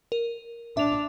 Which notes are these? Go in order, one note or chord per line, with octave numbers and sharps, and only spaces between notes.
A#4
D4 E5 F7